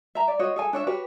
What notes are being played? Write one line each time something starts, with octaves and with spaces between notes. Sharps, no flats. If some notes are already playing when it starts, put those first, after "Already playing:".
E5 A#5
D5
F#4 C5 C#5 D#5
G#4 A4 G#5
D4 C#5 E5
F#4 G4 B4 C#5